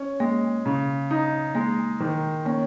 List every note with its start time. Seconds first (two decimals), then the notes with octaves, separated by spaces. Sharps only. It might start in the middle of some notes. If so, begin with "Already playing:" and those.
Already playing: C#4
0.20 G#3 A#3
0.66 C#3
1.11 D#4
1.55 G#3 A#3
2.00 D#3
2.45 A#3 C#4